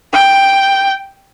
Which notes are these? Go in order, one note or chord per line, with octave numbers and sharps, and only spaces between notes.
G5